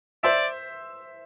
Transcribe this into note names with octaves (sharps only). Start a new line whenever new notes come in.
C5 D5 E5